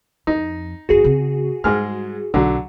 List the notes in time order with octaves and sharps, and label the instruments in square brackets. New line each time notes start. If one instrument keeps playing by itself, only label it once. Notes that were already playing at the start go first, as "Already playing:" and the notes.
[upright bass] F2 [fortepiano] D#4
[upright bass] G1 F2 [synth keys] F#4 G#4
[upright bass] C#3 C4
[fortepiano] G#2 G#3 F6 [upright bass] G3
[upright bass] B1 [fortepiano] D3 F#3